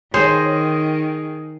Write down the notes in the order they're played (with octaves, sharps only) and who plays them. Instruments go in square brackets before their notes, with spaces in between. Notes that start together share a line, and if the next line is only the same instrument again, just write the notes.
[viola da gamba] D#3 [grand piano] G#4 [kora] C5 [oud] C#5